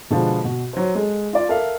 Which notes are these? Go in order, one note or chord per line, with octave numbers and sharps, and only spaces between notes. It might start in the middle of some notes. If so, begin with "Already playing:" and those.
B2 D3 F3 G#3 B3
B2 F#4
F#3 C5
G#3 A4
F4 D5
A4 A#4 E5 F5